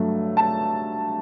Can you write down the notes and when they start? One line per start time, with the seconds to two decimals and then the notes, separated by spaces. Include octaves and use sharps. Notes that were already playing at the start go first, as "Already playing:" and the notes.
Already playing: G2 F#3 A3
0.37 A5